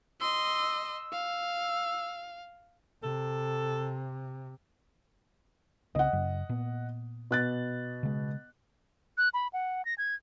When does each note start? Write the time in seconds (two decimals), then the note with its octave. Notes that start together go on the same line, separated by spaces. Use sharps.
0.20 D#5 C6 E6
1.12 F5
3.03 C3 A4
5.95 C2 C#3 C4 D#5 F#5
6.13 F#2 C#3
6.49 A#2 B3
7.31 B2 F#6 A6
8.03 C#3 G#3
9.18 F#6
9.34 B5
9.53 F#5
9.85 A#6
9.98 G#6